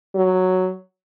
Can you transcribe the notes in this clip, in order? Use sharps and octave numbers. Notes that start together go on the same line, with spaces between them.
F#3